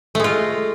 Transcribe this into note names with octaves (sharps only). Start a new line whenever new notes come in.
G#3 A3 F4